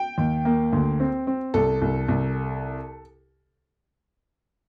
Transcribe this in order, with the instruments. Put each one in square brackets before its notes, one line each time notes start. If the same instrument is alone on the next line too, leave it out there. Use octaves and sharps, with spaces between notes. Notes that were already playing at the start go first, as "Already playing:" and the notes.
Already playing: [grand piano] G5
D#2
A#3
D2
C4
C4
C2 A4
C2
C2